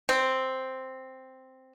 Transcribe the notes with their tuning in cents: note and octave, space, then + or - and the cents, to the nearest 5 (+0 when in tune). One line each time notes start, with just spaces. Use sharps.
C4 +0